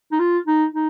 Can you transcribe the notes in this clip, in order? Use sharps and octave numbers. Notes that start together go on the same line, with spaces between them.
D#4
F4
D#4
D#4